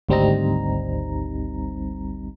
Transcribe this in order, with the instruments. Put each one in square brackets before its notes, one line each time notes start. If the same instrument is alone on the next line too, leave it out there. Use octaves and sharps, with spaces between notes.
[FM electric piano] G#1 D2 G3 C4 D#4 A#5